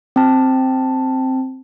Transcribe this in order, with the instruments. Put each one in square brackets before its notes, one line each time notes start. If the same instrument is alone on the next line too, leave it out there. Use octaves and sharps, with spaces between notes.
[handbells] C4 A5